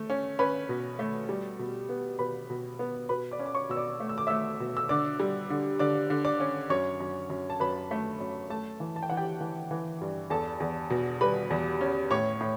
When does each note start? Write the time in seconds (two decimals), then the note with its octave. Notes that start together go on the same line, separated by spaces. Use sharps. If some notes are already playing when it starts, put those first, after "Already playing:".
Already playing: A3
0.10 C#4
0.39 C#4 B4 B5
0.69 B2
0.99 A3
1.29 G3
1.59 B2
1.89 B3
2.19 B2 B4 B5
2.50 B2
2.79 B3
3.09 B2 B4 B5
3.31 D5 D6
3.39 C#4
3.46 D6
3.54 C#5 C#6
3.69 B2 E6
3.77 D5 D6
4.00 A3
4.09 E6
4.18 D6
4.27 A3 E5 E6
4.60 B2
4.77 E6
4.89 D3 D5 D6
5.20 G3
5.50 D3
5.79 D3 D5 D6
6.10 D3
6.25 D5 D6
6.40 C#4
6.70 F#2 C#5 C#6
7.00 F#2
7.30 F#2
7.50 A5
7.60 F#2 B4 B5
7.91 A3
8.20 F#2
8.50 A3 A4 A5
8.80 E3
8.96 A5
9.03 G5
9.10 E3 F#5
9.17 G4 G5
9.41 E3
9.71 E3
10.01 G2
10.30 E2 A4 A5
10.60 E2
10.90 B2
11.21 G3 B4 B5
11.50 E2
11.81 C#4
12.11 A2 C#5 C#6
12.41 A2